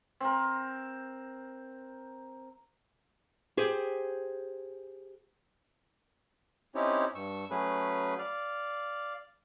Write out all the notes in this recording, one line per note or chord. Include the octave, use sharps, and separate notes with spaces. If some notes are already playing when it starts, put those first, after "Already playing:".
C4 A#4
G4 G#4 C5
C4 C#4 D#4 E4 G4 C#5
G2 C#6 E6
F#3 A3 C#4 G#4 B4
D5 F5